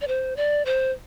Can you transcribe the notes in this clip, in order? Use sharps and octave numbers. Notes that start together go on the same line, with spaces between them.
D5
C5
D5
C5